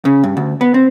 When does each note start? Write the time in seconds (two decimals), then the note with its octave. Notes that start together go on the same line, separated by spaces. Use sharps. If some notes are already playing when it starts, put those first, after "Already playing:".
0.05 C#3
0.23 G2
0.37 D2
0.61 B3
0.74 C4